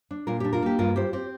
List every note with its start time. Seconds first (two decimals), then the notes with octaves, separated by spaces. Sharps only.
0.11 D4
0.27 A#2 F4 A#4
0.40 G4
0.44 D4
0.53 F4 A#4
0.62 A#3 G4
0.78 G2 F4 A#4
0.96 F4 G4 C5
1.13 C4 G4 C5